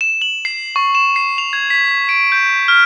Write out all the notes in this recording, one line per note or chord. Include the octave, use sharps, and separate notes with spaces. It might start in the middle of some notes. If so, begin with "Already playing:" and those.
E7
F#7
C7
C#6
E7
C7
F7
G#6
B6
D7
G6
F6